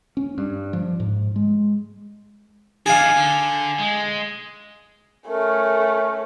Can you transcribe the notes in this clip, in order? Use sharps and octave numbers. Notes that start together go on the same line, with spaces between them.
C#4
G2
F3
G#2
G#3
D4 D#4 G#4 F5
D3
G#3
A3 C#4 A#4